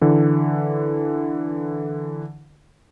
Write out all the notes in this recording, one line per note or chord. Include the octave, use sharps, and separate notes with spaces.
D3 E3